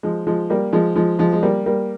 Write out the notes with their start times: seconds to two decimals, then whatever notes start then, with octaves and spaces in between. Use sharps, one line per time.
0.03 F3 G#3
0.27 F3 G#3
0.50 G3 A#3
0.73 F3 G#3
0.96 F3 G#3
1.19 F3 G#3
1.33 G#3
1.43 G3 A#3
1.66 G3 A#3